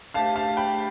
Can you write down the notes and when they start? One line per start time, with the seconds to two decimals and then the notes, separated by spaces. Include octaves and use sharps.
0.14 A3 D4 G4 C5 E5 F5 A5
0.36 F5 A5
0.57 G5 B5